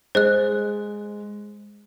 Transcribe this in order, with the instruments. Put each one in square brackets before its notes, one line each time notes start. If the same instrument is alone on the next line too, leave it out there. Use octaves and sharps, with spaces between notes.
[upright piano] G#3 [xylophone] C5 D#5 F#6